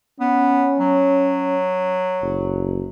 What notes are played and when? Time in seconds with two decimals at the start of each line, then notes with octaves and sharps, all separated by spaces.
0.20 B3 C#4
0.80 F#3
2.23 F#1